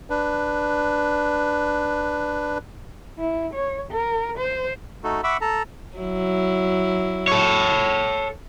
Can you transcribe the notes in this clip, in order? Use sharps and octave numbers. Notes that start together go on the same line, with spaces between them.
D4 B4
E4
C#5
A#4
C5
A3 D#4 F#4 A4
E5 F#5 B5 C#6 D6 E6
A4 A5 A#5
F#3 E4
A4 C#5